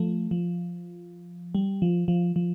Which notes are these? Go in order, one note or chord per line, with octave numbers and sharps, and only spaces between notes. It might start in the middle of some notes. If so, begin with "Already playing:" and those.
Already playing: F3 A3
F3
G3
F3
F3
F3